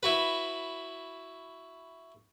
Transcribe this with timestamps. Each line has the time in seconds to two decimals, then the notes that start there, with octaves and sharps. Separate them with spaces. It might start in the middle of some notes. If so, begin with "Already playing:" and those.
0.03 E4 F#4 B4